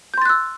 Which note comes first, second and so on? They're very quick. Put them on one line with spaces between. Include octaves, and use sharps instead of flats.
G6 C6 A6 F#6 E6